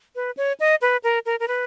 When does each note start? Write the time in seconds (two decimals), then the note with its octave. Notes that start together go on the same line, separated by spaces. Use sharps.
0.16 B4
0.37 C#5
0.60 D#5
0.82 B4
1.04 A#4
1.26 A#4
1.40 A#4
1.48 B4